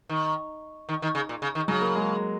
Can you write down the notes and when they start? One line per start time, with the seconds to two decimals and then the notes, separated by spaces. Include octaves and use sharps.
0.09 D#3
0.89 D#3
1.02 D#3
1.15 C#3
1.29 A#2
1.42 C#3
1.55 D#3
1.68 C#3 F#3
1.81 A#3
1.95 G#3